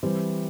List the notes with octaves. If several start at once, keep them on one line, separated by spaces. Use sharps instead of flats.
E3 G3 C4 C5